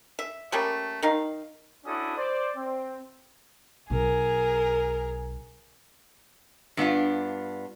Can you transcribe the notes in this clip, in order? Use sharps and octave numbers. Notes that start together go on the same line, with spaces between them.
E5
G3 A3 A#3 C#4
D#3 D#4 F5
C#4 D4 E4 F#4 A4 D#6
C5 D5
C4
B1 G#4 A#4
G2 B3 D4 F4